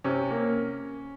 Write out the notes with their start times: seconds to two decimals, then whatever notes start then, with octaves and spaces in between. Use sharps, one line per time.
0.04 C3 C#4
0.31 A#3